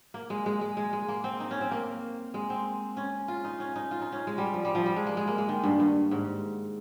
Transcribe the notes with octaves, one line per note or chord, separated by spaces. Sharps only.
A#3
G#3
G#3
G#3
G#3
G#3
A#3
C4
D#4
C#4
C4
A#3
G#3
C4
C#4
F4
D#4
C#4
D#4
F4
D#4
C#4
G#3
G3
F3
G3
F3
G3
G#3
A#3
G#3
A#3
G#3
D#3
G2
G2
G#2